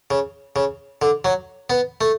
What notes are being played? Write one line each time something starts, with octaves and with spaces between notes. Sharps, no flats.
C#3
C#3
D3
F#3
B3
A3